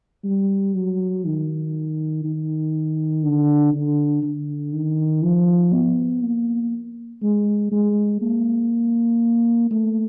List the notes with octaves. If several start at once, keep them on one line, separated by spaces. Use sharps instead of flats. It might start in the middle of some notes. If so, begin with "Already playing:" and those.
G3
F#3
D#3
D#3
D3
D3
D3
D#3
F3
B3
A#3
G#3
G#3
A#3
A3